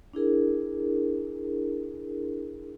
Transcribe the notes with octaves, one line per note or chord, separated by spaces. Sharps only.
D4 E4 G#4 A#4